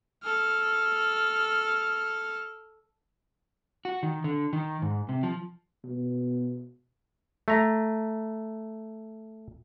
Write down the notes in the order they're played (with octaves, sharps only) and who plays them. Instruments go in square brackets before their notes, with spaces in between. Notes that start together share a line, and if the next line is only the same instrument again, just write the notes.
[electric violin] A4 F6
[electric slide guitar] F#4
D#3
D3
D#3
G#2
C3
F3
[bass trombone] B2
[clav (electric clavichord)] A3 A#5